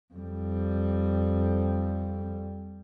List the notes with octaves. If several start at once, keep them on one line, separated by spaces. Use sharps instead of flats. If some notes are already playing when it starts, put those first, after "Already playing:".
F2 G3